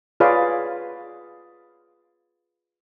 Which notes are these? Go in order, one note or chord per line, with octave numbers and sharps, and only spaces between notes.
F4 G#4 B4 C#5 D5 F5